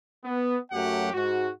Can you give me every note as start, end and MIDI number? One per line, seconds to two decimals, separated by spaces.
0.24 0.57 59
0.72 1.11 42
0.72 1.11 54
0.72 1.11 57
0.72 1.11 67
0.72 1.11 78
1.13 1.49 44
1.13 1.49 66